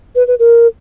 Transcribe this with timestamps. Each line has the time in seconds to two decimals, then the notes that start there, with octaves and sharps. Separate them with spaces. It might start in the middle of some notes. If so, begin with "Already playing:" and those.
0.16 B4
0.27 B4
0.39 A#4